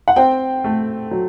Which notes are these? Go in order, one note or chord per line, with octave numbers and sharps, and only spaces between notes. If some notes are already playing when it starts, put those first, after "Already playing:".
F#5
C4 G5
A3
F#3